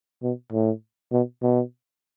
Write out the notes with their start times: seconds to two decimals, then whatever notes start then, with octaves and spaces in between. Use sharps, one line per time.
0.23 B2
0.52 A2
1.12 B2
1.42 B2